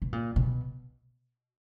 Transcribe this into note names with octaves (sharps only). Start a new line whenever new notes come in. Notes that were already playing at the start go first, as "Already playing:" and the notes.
B2
A#2
B2